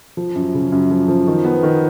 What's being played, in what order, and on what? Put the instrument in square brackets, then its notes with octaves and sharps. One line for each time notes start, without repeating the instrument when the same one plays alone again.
[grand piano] F3
F#2
C#3
F#2
F3
F3
D#3
B3
D#3